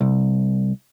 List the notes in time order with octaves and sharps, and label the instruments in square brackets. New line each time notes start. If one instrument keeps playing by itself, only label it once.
[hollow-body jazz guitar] C2